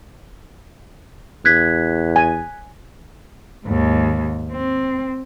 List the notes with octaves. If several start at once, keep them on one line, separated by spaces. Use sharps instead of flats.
E2 F#6 G#6 B6
G#5
D#2 G#2
C4